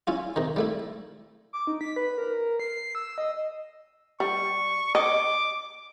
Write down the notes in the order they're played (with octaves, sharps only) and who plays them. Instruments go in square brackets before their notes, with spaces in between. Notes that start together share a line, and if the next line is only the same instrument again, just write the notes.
[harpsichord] C#4 E4 F4
C3 D#3
G3 A3 E4
[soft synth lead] D6
D#4
B6
B4
A#4
C7
E6
D#5
[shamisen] G3 [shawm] C#6
[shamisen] D#5 [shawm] D6